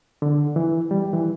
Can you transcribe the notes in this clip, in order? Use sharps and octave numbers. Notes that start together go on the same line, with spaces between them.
D3
E3
G3
E3